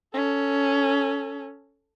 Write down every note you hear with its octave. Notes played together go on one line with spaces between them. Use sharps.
C#4 A4